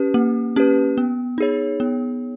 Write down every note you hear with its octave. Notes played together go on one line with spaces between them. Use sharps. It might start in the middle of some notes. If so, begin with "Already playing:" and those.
Already playing: C#4 G4 B4
A#3
C#4 G4 B4
B3
D#4 G#4 C#5
B3